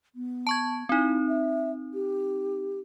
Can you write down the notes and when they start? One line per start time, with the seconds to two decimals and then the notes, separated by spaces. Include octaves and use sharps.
0.15 B3
0.47 A5 C#6 G#6
0.89 C4 D#4 E4
1.28 E5
1.94 G4